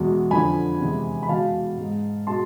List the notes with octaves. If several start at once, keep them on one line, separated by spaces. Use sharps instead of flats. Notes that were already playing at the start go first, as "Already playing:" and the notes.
Already playing: E2 B2 G#3
F2 D3 F3 G#5 B5
E2 C3 G#3
B5
E2 B2 G#3 F5 A5
G#2 G#3
B2 G#3 A5 C6